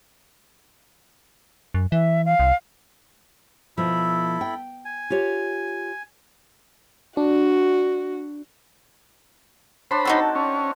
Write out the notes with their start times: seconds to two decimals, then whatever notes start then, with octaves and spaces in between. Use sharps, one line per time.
1.74 F#2
1.92 E3 E5
2.25 F5
2.40 C2
3.77 B2 F3 E4 A4 B5
4.41 G5
4.85 G#5
5.10 F4 G4 C#5
7.17 D4 F#4
9.91 D4 C5 C#5 A5 B5
10.05 C4 D#4 F#4 A4
10.35 C#4